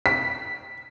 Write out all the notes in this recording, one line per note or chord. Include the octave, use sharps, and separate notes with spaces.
B6